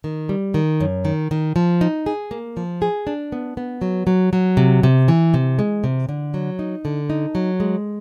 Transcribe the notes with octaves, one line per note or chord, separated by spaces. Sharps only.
D#3
G3
D#3
F#2
D#3
D#3
F3
D#4
G#4
A#3
F3
G#4
D4
B3
B3
F#3
F#3
F#3
C3
C3
E3
C3
G#3
C3
D3
F#3
D#4
D3
D#4
F#3
G#3